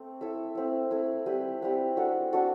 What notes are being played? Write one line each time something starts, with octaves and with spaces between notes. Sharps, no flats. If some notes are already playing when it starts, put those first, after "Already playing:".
Already playing: A3 C4
E4 A4 E5
A3 C4 E4
A3 C4 E4
G3 C4 G4 B4
G3 C4 G4 B4
D4 F#4 A4
D4 F#4 A4